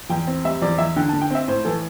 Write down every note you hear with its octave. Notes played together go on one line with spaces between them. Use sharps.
E2 G5
C4
G3 E5
E2 D5
E2 E5
D3 G5
D3 A5
G5
C4 E5
A2 C5
E3 A4